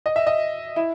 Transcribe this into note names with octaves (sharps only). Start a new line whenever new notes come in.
D#5
E5
D#5
E4